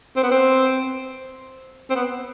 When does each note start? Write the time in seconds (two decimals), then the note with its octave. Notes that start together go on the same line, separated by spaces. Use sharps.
0.16 C4
0.23 B3
0.31 C4
1.90 C4
1.95 B3